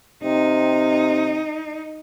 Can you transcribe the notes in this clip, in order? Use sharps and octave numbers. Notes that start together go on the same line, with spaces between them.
C3 D#4